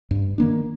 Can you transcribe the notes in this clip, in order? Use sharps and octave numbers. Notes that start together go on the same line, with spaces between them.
G2
D#3 A#3 D4